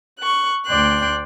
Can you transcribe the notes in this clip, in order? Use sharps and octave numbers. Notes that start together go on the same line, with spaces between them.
C#6 F#6
D2 D5 G5 C6 F#6